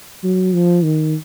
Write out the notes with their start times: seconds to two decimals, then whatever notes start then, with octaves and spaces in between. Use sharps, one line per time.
0.24 F#3
0.54 F3
0.84 D#3